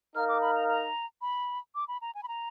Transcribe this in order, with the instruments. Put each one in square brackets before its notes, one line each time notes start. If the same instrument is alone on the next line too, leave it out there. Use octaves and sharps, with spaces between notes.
[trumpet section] D#4 A#4 F5 [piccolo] F6
[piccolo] D6
B5
A#5
A#5
B5
D6
B5
A#5
G#5
B5
A#5